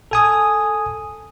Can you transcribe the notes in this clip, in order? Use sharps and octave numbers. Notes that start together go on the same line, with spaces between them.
A4 G#5 D#6